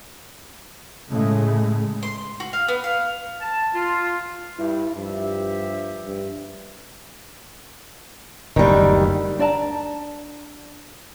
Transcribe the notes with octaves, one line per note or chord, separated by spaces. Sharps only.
A2 C#3 G#3 A3
C6
F#4
F5
B3
F5
A5
F4
G2 E4
G2 F3 G4 E5
G2
F#1 D2 D#3 G3
D4 D5 A5 A#5